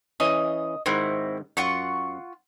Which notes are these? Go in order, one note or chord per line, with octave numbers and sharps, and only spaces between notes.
E3 C#4 D#5
G#2 D#3 C4 E4 F#4
F#2 F4 F#5 C#6